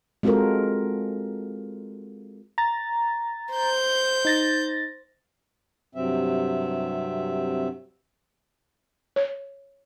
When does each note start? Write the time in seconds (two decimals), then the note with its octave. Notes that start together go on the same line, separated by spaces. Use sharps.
0.23 G#3 C4 F4 F#4 A4 A#4
2.58 A#5 A6
3.54 C5 G6
4.25 D#4 A6 A#6
5.95 G2 C3 F#3 C4 E5
9.16 C#5